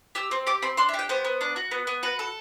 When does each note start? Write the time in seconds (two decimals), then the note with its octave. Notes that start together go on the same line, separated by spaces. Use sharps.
0.15 G4 E6
0.31 C4
0.47 G4 D6
0.62 C4 B5
0.77 D4 C6
0.89 E5
0.94 G4
0.99 G5
1.09 B3 C5
1.25 B3
1.41 D4
1.56 F#4
1.71 B3
1.87 B3
2.03 F#4 B4
2.19 A4